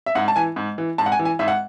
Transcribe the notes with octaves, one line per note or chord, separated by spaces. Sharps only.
E5
G#2 F#5
A5
E3 G#5
G#2
E3
G#2 A5
F#5
G#5
E3
G#5
G#2 E5
F#5